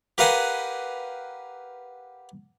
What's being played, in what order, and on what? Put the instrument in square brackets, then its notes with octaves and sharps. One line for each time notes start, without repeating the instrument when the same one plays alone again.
[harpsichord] G4 A#4 B4 F5 F#5 G#5